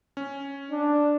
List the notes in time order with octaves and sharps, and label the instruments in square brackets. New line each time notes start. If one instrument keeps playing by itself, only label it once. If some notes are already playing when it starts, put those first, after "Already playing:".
[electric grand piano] C#4
[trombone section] D4